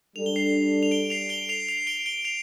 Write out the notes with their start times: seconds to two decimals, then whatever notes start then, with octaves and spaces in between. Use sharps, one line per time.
0.16 G3 D4 A4 F7
0.26 G7
0.36 C7 F7
0.83 F7
0.91 D7 G7
1.10 C7 F7
1.29 D7 G7
1.49 C7 F7
1.69 C7 F7
1.87 D7 G7
2.06 D7 G7
2.25 C7 F7